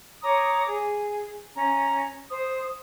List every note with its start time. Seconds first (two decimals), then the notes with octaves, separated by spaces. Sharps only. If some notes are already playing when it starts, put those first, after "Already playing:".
0.22 C#5 A#5 D6 D#6
0.67 G#4
1.54 C#4 A#5
2.30 C5 D#6